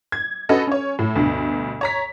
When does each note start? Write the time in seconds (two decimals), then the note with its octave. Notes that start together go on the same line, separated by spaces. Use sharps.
0.12 G#6
0.49 C#4 F#4 A4 B4 D#5
0.67 C#4 C#5
0.99 A2
1.16 D2 G2 B2
1.81 C#5 A#5 B6